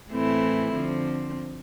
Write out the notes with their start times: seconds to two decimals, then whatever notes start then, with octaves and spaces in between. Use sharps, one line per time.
0.10 A2 E3 A3 C4 E4
0.72 D3 F3 C4